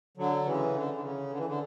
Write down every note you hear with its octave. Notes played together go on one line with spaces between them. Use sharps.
D3 F#3
C#3 E3
D3
D3
C#3
D3
E3
D3